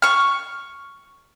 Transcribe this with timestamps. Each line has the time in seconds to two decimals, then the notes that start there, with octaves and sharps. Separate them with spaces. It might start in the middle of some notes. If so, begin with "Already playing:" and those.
0.02 C#6 F6